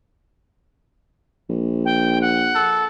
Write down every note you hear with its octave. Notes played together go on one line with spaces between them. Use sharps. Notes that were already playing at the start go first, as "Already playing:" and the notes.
A#1
G5
F#5
A4